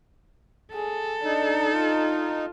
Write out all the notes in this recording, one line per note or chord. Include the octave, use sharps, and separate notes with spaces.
G#4 A4
D4 D#4
F4